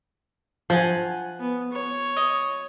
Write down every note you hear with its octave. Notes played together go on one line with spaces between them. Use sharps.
F3 F5 F#5 G#5
B3
C#5
D#5